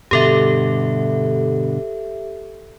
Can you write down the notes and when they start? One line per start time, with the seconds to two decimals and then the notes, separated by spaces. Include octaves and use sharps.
0.11 G2 B2 D3 G4 A4 E5